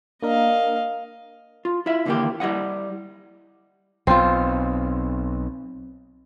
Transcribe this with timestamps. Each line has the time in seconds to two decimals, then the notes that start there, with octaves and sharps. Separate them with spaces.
0.23 A#3 D4 A#4 D#5 F5
1.65 F4
1.86 E4 F4 E5
2.05 D#2 D3 E3 G#3 A#3 G4
2.40 G3 E4 D#5 F#5
4.07 B1 C4 F4